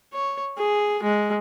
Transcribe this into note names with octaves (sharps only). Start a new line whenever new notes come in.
C#5
G#4
G#3